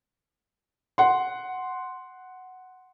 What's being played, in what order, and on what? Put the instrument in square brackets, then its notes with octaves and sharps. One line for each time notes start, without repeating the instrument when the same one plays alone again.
[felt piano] F#5 C6